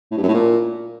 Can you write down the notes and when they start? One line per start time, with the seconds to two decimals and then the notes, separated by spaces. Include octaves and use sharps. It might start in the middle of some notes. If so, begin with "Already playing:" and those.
0.12 A2
0.17 G2
0.23 F#2
0.28 A2
0.34 A#2